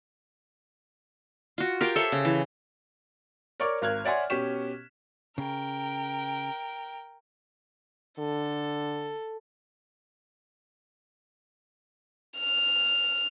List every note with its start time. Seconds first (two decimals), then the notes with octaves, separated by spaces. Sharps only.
1.58 F4 F#4
1.81 F4 G4 A#4
1.96 A4 C5 C#5 E5
2.12 C#3
2.25 E3
3.60 A#4 C#5 D5 C#6 D6
3.82 G#1 A#4 F6 F#6 G#6
4.05 C#5 D5 E5 F#5 G#5 C6
4.30 B2 C#4 G4 C#6 B6 E7
5.38 C#3 A#4 G5
8.19 D3 A4
12.38 F6